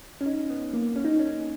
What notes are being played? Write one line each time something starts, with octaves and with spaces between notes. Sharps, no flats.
C#4
D#4
B3
A#3
C#4
D#4
C#4